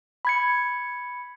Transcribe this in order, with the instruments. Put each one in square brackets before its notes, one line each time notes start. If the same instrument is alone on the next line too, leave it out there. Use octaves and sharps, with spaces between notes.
[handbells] B5 G#6 C#7